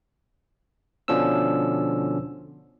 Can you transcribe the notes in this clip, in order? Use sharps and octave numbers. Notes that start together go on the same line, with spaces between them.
B2 D3 F3 C#4 D4 E6